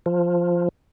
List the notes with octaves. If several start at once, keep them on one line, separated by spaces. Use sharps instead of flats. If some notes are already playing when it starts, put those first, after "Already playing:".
F3